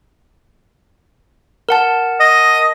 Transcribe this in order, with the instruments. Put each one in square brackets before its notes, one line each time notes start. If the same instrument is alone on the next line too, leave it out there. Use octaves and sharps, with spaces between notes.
[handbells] A#4 F#5 A5
[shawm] D#5